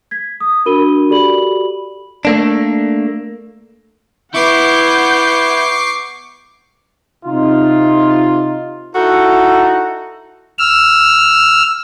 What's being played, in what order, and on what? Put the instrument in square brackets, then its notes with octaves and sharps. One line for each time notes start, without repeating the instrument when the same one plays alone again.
[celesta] G#6 B6
D#6
D4 F#4 A#4 B5 D#7 G7
F#4 G4 A4 D5 B5 F#7
[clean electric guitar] A3 A#3 D4
[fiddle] B3 [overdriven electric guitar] E4 [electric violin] F#5 G6 [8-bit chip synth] C#6 D6 C7
[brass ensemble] C3 D#4 F4
[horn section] D#4 E4 F#4 A4
[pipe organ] E6 F6